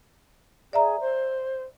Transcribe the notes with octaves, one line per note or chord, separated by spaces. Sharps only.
G#4 D5 E5 A#5
C5